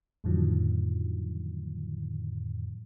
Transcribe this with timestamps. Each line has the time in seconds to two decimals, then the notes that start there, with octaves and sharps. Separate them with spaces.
0.24 F2 A2 D3 D#3 F3 F#3